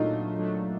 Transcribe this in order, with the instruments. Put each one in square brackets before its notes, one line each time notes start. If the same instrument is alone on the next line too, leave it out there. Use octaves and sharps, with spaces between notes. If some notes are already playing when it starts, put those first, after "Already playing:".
Already playing: [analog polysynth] A#2 F#3 A3 D4 [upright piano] D#4 F4
[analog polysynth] A#2
F#3 A3 D4